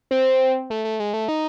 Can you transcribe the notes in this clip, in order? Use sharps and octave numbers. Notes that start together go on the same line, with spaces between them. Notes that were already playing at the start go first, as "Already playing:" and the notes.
C4
A3
A3
G#3
A3
D#4